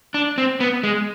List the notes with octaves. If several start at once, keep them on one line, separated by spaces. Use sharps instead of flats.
D4
C4
B3
G#3